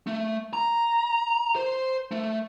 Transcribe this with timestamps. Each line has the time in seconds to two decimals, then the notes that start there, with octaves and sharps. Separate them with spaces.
0.07 A3
0.53 A#5
1.56 C5
2.11 A3